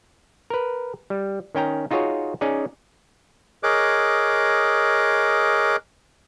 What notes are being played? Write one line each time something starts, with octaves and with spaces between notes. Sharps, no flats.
A#4 B4
G3
D#3 C#4 G5 A#5
D#4 F4 F#4 G#4 C#5
C#4 D#4 G#4 D5
G#4 A#4 C#5 D#5 D6 F#6